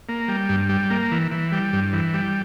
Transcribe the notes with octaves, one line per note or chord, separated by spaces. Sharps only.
A#3
G3
G2
G3
A#3
E3
E3
G3
G2
E3
G3